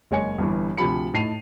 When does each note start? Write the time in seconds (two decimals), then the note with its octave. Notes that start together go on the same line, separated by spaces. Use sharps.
0.11 F#1 G#3 C#5 G#5 C#7
0.38 G1 G2 E3
0.77 D2 C3 F3 G4 B5 C#7
1.14 A2 D#4 A5 C7 D#7 F7